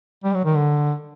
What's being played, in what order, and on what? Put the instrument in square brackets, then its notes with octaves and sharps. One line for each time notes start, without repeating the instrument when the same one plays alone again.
[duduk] G3
F#3
D#3
D3